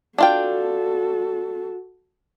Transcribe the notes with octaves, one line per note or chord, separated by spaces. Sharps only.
D4 F4 F#4 A4 G5